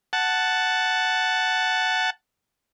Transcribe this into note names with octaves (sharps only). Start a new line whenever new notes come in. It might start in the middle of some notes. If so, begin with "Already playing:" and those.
F#5 A5